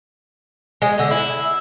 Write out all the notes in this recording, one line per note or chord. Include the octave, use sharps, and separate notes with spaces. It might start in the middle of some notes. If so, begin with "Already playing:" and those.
G#3
D3
E4